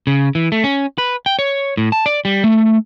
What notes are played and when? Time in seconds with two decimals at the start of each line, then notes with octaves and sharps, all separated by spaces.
0.07 C#3
0.35 E3
0.52 A3
0.64 C#4
0.98 B4
1.26 G5
1.39 C#5
1.77 A2
1.92 A5
2.06 D5
2.25 G3
2.44 A3